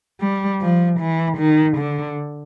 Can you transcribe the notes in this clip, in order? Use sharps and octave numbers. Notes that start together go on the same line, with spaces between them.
G3
F3
E3
D#3
D3